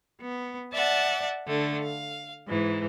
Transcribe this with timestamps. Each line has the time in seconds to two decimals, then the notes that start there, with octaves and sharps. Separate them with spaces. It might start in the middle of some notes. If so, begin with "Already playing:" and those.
0.23 B3
0.73 D5 E5 F#5 A5
1.47 D3 A3
1.83 F5
2.48 G#2 E3